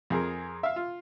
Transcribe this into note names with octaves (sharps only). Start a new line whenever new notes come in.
F2 G#4 A#4
E5 F5
F4